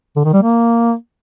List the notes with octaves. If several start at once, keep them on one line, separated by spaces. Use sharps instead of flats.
D3
D#3
G3
A#3